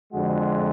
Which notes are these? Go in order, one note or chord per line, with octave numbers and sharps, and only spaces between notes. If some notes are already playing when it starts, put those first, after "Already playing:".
F2 D3 G#3 F#4